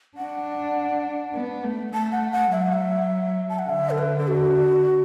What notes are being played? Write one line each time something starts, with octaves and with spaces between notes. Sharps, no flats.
D4 F#5
B3
A3
A3 A5
F#5
F#5
F#3 E5
F#5
E5
A5
F#5
D3 E5
A4
B4
A4
F#4